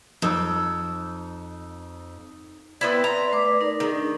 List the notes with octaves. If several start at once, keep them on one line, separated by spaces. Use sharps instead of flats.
F2 D#4 E6
B3 C4 E4 D5
B4 A#5 C6
A3 B4 D6
D#4 A#4
D#3 G#4
D4